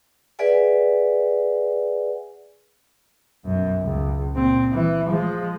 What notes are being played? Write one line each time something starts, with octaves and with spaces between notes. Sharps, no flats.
G#4 B4 D5 E5 F#5 G#5
B1 F#2
C#2
A#2 C4
E3
F3 G#3